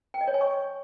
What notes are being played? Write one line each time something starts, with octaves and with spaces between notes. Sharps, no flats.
G5
D#5
C#5
G#5
C#6